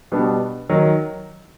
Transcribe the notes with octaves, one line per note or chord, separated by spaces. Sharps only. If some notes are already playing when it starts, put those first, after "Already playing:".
B2 G3 B3 D4
D#3 F#3